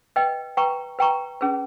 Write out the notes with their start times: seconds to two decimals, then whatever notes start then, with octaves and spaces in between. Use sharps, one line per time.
0.16 B4 D#5 G5
0.57 B4 G5 A#5 C#6
0.99 B4 G5 A#5 C#6
1.41 C#4 G#4 B4